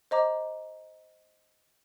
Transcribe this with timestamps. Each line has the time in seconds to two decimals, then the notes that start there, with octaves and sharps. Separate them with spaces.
0.11 C5 D#5 A#5 D6